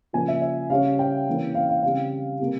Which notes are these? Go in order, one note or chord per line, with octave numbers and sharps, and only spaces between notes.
C#3 F3 A#3 G#5
E5
E5
C#3 G3 C#4 F5
G5
C3 E3 A#3 C#4
F5
F5
C#3 G3 C4 F5
C3 G3 A#3